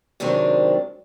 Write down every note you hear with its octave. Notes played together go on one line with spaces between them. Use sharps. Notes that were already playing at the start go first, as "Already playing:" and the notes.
C3 D#3 F#3 G#3 C4 D4